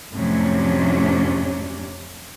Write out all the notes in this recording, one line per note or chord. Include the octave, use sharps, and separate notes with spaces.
F2 A2 C3 F#3 C#4 D4